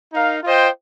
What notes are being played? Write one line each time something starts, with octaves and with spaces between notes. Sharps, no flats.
D#4 A#4 F5
F4 C5 D#5 G5